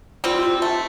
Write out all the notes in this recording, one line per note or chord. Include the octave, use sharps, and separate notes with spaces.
G3 C4 F4
F4
A3